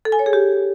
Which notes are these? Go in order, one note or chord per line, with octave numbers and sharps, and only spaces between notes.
A4
G#5
C#5
G#4
G4